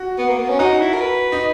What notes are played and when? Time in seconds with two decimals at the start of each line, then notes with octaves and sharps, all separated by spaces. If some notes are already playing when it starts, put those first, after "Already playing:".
Already playing: F#4
0.18 B3
0.29 A#3
0.38 B3
0.49 C#4
0.59 D#4 F#4
0.80 E4
0.94 A#4
1.00 B4
1.32 D#4